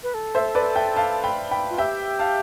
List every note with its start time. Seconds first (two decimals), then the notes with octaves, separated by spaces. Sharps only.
0.03 B4
0.14 A4
0.35 C5 E5
0.55 B4 D5
0.76 E5 G5
0.96 F5 A5
1.24 G5 B5
1.51 G5 B5
1.70 F4
1.78 G4 E5 G5
2.19 F5 A5